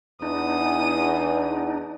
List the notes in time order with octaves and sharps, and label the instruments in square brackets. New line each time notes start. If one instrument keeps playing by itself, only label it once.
[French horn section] E2 [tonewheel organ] D4 D#4 [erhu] D#6